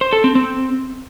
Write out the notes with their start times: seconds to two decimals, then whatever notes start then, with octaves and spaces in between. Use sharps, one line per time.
0.01 C5
0.13 A4
0.24 C4
0.35 C4